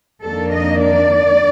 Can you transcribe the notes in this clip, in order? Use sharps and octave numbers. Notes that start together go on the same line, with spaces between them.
F2 D#3 A#3 D4 A4
D#5
D5